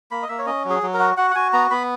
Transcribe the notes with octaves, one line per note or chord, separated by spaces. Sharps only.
A#3 B5
D#5
A#3 E5
C#5
C#4 D#5
F#3 G#4
F#3
A#4
F#4
F#4 F#5
F#5
F#4 G#5
B3 A#5
B3 B5